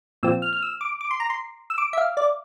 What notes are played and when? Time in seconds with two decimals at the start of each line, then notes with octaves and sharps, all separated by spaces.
0.23 A#2 F3 C4 E6
0.42 F6
0.53 F6
0.62 E6
0.81 D6
1.01 D6
1.11 C6
1.20 A#5
1.30 C6
1.70 E6
1.78 D6
1.93 E5
1.98 F5
2.17 D5